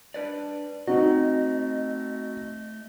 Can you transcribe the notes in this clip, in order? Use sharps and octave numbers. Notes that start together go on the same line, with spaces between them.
D4 B4 D5
A3 C4 D#4 F#4 D#5